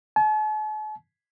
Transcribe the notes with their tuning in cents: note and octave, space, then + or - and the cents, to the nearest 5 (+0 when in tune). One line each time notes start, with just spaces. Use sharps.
A5 -45